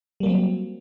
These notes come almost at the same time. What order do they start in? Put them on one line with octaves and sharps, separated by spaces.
G3 A#3 F#3 C4